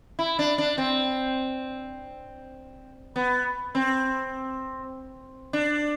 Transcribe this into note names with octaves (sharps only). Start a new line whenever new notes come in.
E4
D4
D4
C4
B3
C4
D4